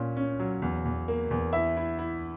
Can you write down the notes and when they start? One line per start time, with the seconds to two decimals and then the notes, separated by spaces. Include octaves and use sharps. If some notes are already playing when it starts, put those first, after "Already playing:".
Already playing: A#2 C#4
0.17 C#4
0.40 F#3
0.62 E2
0.85 E2
1.08 A#3
1.31 E2
1.53 E4 E5
1.77 E4
1.99 E4